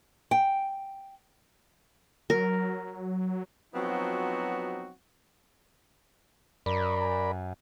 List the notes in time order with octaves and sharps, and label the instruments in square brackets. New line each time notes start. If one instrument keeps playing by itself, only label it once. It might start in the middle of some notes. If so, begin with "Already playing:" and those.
[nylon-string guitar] G5
[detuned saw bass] F#3 [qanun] A#4
[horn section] F3 F#3 B3 C4 D#4 F#4
[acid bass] F#2 [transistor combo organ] A#4 D5 B5